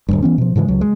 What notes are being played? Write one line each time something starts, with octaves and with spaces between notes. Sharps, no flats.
D1 G1 G2
E3 B3 C#4
B2 F3
G#2 C#3 E3 G#3
C#2 F#3
G#3